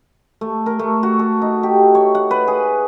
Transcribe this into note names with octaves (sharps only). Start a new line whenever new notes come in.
A3
A#4
A3
F#4
A4
D#4
G4
C#5
F#5
B4
G#4